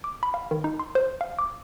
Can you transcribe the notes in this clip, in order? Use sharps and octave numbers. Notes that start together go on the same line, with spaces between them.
D6
B5
F5
D#3
D#4
C6
C5
F5
D6